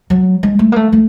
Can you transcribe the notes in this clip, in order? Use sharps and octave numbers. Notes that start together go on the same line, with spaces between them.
F#3
G#3
A3
A#3
A3
A3